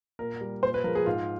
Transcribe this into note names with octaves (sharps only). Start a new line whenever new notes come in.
A#2 A#4
G3
A#2 C5
B4
F3 G#3 A#4
G#4
G#2 F4